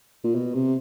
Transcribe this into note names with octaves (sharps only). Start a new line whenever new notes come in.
A#2
B2
C3